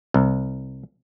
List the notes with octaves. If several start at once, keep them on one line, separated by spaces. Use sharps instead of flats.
C2